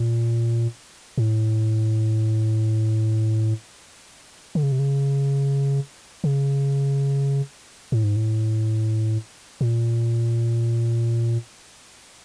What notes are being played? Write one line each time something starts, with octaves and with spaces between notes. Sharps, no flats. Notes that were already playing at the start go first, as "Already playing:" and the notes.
Already playing: A#2
A2
D3
C#3
C3
C#3
C#3
A2
G#2
A2
A#2